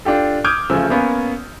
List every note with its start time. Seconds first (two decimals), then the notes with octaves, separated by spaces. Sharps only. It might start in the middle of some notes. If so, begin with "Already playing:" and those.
0.05 D4 F4 G4 A4
0.44 D6 D#6 F6 G6 G#6 D7
0.70 D1 C#3 F3 A3 G#5 E6
0.90 A#3 B3 C#4